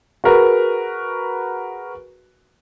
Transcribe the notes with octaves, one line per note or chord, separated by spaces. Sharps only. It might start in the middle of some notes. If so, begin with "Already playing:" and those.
F#4 G#4 A#4 B4